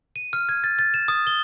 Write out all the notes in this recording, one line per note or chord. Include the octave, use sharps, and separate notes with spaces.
D#7
F6
G#6
A6
A6
E7
D#6
G7